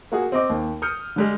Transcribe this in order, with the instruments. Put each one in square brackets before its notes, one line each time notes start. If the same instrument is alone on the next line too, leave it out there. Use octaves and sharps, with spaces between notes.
[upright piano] A#3 F#4 G#4
C4 D#5 D6
D#2
D#6 F6 G6 C#7
D3 G3 G#3